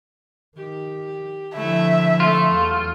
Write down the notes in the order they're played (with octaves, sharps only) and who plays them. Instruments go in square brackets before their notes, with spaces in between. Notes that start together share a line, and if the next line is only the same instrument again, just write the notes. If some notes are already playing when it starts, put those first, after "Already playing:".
[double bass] D#3 [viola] G4
[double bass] D3 F3 [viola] A3 E4 [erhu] E5
[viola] A3 A4 [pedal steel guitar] F4
[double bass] E2 F#3